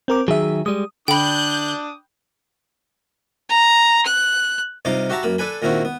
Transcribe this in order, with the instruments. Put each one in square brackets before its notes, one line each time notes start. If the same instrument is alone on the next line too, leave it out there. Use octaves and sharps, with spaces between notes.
[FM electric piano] C4 A#4 D6
[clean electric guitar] D#3 F#3 [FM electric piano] G#4 E5
[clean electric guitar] G3 G#3 [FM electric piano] D#6
[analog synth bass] D3 [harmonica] D4 D6 D#6 [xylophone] G5 B5 [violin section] F#6 G6
[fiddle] A#5
F#6
[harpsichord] G2 C3 D#4 F4 F5 D6
F#4 G4 E5 A5 A#5
F#2 A#3 B5
D4 A4 B4 G#5 B5
A#2 D#3 A#3 C4 E4 F#4
B3